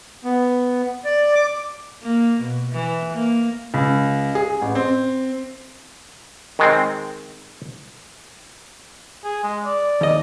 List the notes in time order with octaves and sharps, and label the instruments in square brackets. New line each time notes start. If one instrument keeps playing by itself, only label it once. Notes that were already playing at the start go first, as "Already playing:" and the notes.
[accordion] B3
D5
D6
[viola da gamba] A#3
B2
E3
A#3
[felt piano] C#2
G#4
A1
C4
[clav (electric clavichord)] D#3 G#3 C4
[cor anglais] G#4
G#3
D5
[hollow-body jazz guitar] D#2 D#5